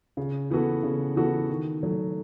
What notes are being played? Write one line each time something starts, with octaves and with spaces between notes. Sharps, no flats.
C#3
E3 B3 F#4 A4
C#3
E3 B3 F#4 A4
D#3
F#3 A3